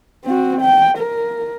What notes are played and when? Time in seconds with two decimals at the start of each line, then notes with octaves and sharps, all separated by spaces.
0.24 C4 F#4
0.61 G5
0.98 A#4